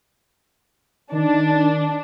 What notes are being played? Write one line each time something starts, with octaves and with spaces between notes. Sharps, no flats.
D#3 D4